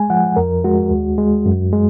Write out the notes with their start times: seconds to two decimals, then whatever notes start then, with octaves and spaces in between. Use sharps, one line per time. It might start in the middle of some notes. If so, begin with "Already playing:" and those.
Already playing: G#3 G#5
0.10 F3 F#5
0.36 F2 A#4
0.64 G#3 F#4
0.91 D#2
1.18 G#3
1.46 F#2
1.73 G#3